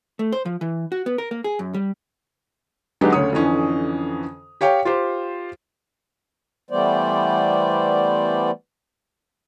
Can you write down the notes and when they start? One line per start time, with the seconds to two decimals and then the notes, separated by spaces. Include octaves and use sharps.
0.19 A3
0.32 C5
0.46 F3
0.61 E3
0.92 F#4
1.06 B3
1.18 A#4
1.31 A#3
1.44 G#4
1.59 F#2
1.74 G3
3.01 D3 F#3 G#3 B3 D#4 G4
3.12 D2 C#3 C#5 D#6
3.33 F2 D3 E3 C#4
4.61 G4 C#5 F5 G5
4.85 F4 G4 C5
6.70 E3 G3 A3 B3 C5 D5